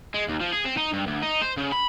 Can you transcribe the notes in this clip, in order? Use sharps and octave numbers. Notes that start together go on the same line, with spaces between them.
G#3
D#2
F3
G#4
C4
D#4
G2
D2
D#4
C5
C#3
B5